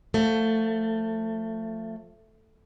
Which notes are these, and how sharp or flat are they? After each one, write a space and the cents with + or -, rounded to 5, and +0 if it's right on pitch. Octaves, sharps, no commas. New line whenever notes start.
F3 +15 A3 +20